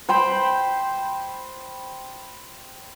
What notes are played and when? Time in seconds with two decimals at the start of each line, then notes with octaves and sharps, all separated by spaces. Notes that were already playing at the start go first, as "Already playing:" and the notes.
0.09 C5 G5 B5